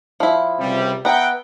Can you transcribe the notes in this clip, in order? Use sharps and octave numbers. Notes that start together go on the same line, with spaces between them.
F3 E4
C#2 C3 G3
B3 E5 F#5 G5 A#5